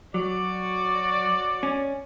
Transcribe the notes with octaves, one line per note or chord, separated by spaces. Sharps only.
F#3 F#4 C#5 D5
C#4